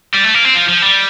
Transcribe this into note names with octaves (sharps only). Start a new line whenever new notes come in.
G3
A3
A#3
C4
F3
F3
G3